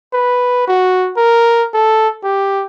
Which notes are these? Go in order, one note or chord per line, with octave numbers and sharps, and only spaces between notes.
B4
F#4
A#4
A4
G4